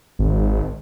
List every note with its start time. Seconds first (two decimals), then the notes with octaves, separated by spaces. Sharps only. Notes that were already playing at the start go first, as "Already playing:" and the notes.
0.19 G#1